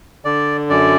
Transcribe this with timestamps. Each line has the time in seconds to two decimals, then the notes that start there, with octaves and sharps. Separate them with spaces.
0.25 D3 D5
0.70 F#2 D5